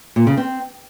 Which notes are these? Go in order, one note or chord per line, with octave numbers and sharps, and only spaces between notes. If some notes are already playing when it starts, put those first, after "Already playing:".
A#2
C#3
C4